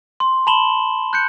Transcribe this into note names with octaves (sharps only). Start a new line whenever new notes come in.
C6
A5 B5 C6 E7 F#7 G7
F#6 G6 C#7